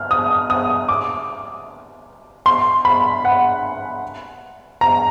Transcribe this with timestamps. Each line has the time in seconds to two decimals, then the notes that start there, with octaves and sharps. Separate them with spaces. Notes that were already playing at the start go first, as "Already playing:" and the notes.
Already playing: F6
0.11 D#6
0.50 D#6
0.88 D6
2.46 C6
2.85 B5
3.25 F#5
4.81 A#5